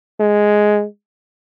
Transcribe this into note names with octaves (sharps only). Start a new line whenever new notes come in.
G#3